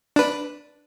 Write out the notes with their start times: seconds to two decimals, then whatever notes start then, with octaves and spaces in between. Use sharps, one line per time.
0.16 D4 B4